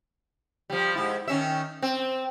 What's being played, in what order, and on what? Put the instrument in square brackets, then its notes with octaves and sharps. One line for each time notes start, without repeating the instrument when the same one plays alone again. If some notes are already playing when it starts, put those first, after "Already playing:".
[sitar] F3 G3
G#2 E4
D#3 C#4 E5
C4